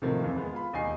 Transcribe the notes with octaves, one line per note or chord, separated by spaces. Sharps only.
A2 C3 D#3 F3 A#3
F2 E3
G#3 B3
F4 B5
E1 D#2 D#4 G#5 C7